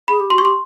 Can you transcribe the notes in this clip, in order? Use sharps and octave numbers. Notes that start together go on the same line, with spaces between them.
G#4 B5
G4
F#4 C6
C#6
G4
C6